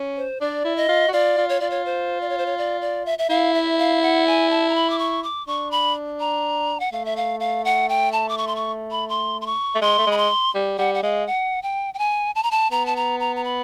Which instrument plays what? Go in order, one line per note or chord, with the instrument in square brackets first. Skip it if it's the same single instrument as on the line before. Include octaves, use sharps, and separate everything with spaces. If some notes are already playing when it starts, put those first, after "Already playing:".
Already playing: [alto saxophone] C#4
[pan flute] C5
[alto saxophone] D4 [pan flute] D5
[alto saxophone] E4
[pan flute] D#5
[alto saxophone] F4
F#4
[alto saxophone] F4 [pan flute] D5
[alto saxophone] F4
[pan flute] C#5
[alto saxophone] F4 [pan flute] D5
[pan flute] C#5
C5
D5
C#5
C5
C#5
D5
D5
E5
E5
[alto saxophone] E4 [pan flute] F5
[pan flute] E5
F5
F#5
G#5
A5
A#5
B5
D6
C#6
D6
[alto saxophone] D4 [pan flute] C#6
[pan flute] B5
A#5
F#5
[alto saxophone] A3 [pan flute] F5
[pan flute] E5
F5
F5
F#5
G5
A5
D6
C#6
C6
C#6
B5
C6
C6
C#6
[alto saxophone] A3
[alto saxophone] G#3 [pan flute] C6
[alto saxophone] A3
G#3
[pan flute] B5
C6
[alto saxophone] G3
[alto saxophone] G3 [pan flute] F#5
[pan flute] F#5
[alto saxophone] G#3 [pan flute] F5
[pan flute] F#5
G5
G5
G#5
A5
A#5
A5
[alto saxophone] B3 [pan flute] A#5
[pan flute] A5
A#5
A#5
A#5
B5